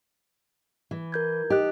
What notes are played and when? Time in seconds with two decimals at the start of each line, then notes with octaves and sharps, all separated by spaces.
0.91 E3
1.12 A#4 G6 G#6
1.50 D#4 G4 D#5 F#6